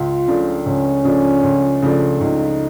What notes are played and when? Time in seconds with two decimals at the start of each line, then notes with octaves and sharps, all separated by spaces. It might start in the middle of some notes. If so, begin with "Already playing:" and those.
Already playing: C#2 F4
0.28 C#3 F3 A3 D4
0.66 C#2 C#4
1.04 C#3 F3 A3 D4
1.44 C#2
1.82 C#3 F3 A3 D4
2.21 C#2 D#4